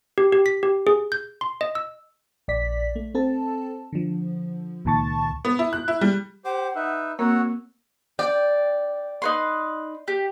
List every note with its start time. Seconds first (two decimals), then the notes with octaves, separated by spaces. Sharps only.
0.18 G4
0.33 G4
0.46 B6
0.63 G4
0.87 G#4
1.12 G6
1.41 C6
1.61 D#5
1.75 E6
2.48 A#1 D5 B6
2.96 A3
3.15 C4 A4 A5
3.93 D3 F3
4.85 C#2 A#2 D#3 A5 C#6 A6
5.45 B3
5.59 E4
5.73 F#6
5.88 E4
6.01 G3
6.45 G4 C5 F#5 D6
6.75 D#4 B4 E5
7.19 A#3 C4 F#4 A#4 C#5 F#5 E6
8.19 D5 G5
9.22 D#4 B4 C6
10.08 G4